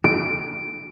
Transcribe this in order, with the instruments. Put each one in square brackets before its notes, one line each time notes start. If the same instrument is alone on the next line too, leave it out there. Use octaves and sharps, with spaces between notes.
[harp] D7